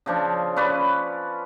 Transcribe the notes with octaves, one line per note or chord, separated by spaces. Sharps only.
C#3 F3 D4
C#4 B4 D5